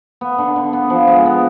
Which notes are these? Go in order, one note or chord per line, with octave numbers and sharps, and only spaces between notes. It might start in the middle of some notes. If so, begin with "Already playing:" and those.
B3
D3
D3
B3
F3
G#3
B3